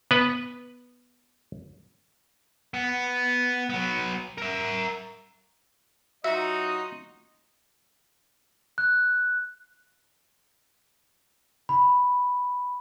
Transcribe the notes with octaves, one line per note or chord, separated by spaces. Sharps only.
B3 B4
B3
F#3 B3
A#4 E5
F#3 D#4 F4 F#4 D#5 E5
F#6
B5